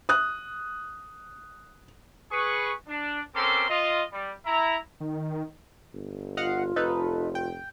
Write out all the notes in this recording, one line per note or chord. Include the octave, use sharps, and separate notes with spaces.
D#6 F#6
G#4 B4 C#6
D4
C4 C#4 A4 A#4 C6 D6
F4 D#5
G3
E4 A#5
D#3
G1
F4 D#5 F5 F#5
F1 D#4 A4 B4
G5